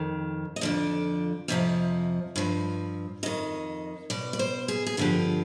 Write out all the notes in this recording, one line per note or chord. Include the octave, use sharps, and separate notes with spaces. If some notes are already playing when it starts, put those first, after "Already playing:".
Already playing: F2 D#3
D#5
F2 D3 F3 D5
F2 C3 F3 D#5
G2 F3
F2 D#3 D#5
B2 D5
D5
C5
G#4
G#4
G2 D3 F3 G4